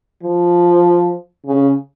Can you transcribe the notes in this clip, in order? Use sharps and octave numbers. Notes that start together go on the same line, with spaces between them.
F3
C#3